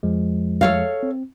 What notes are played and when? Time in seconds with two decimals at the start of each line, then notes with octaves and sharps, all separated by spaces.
0.03 F2 F3 G#3
0.61 A4 C#5 F5
1.03 C4